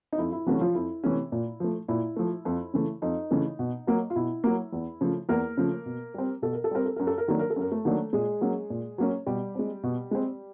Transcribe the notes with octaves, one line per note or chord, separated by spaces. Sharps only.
D#4
F2 E4
E4
C3 E3 F#3 A3 C#4 F#4
F3 F4
F2 E4
C3 E3 A3 C#4
A#2
F3 A3
A#2 E4
F3 A3
F2
C#3 E3 A3
F2 D#4
C#3 E3 A3
B2
F#3 A#3
F4
B2 E4
F#3 A#3
E2
C#3 F3 A3
E2 A#3 A#4
C#3 F3 A3
B2
G3 C4
B2 A4
A#4
A4
G3 C4 A#4
A4
F#2 A#4
A4
A#4
D#3 F#3 A#3 D4 A4
A#4
A4
F#2 A#4
A3 A4
D#3 F#3 A#3 D4
A#2 G#3 G#4
F#3 A#3 C#4
A#2
F#3 A#3 C#4
B2 G3 G4
G#3 C4
B2
G#3 C4